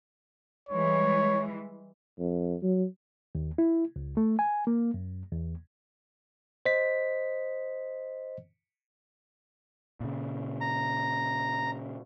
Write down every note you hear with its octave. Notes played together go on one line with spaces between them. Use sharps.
E3 G3 G#3 C#5
F2
F#3
D#2
E4
C#2
A3
G#5
A#3
F#2
E2
C5 D#5 B6
A#2 C#3
A#5